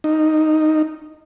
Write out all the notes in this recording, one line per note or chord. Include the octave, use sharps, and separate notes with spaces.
D#4